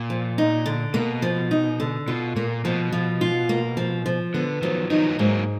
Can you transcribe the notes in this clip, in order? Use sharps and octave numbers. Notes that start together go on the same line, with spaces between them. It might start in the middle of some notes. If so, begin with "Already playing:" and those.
Already playing: A#2
F3
D#4
D3
B2 A#3
F3
D#4
D3
B2 F4
A#2 A#3
B2 F3
F3
F4
A#3
F3
F3
D3 B3
D#3 F3 F#3
D#3 F#3 D#4
B3
G#2 F#3 A#3